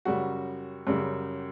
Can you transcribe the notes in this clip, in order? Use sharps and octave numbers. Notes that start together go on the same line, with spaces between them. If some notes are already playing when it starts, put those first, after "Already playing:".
F#2 C#3 G3 F#4
F#2 C#3 G3